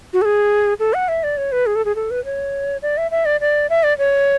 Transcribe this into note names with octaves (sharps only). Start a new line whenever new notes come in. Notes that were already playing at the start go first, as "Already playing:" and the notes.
F#4
A4
G#4
A4
F#5
E5
D5
C#5
B4
G#4
A4
G#4
A4
B4
C#5
D5
E5
E5
D5
D5
E5
D5
C#5